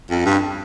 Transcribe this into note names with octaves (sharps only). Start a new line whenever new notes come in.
F2
G2